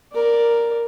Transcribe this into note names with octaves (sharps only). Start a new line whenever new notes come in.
A#4 D5